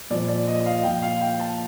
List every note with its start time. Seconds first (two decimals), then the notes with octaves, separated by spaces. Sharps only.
0.10 A#2 F3 D5
0.28 D5
0.47 D#5
0.60 D#5
0.66 F5
0.83 A#2 F3 G5
1.02 F5
1.21 G5
1.40 A5